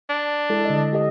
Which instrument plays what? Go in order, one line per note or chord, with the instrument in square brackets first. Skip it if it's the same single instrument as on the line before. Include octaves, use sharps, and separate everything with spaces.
[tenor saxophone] D4
[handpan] G#3 E4 A4
D3 G#3 D#5
G4 A4 D#5